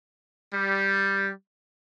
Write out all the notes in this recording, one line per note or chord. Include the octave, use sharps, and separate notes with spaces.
G3